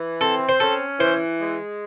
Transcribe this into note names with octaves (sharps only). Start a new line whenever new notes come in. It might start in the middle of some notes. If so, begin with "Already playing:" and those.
Already playing: E3
C4 A4
C5
C#4 A4
E3 C5
G#3